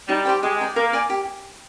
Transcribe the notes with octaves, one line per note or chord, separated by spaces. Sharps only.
G3 D#4
G4 C5 G5
G#3 G4
D5 G5 A#5
A#3 A#4
D5 G#5 D6
G4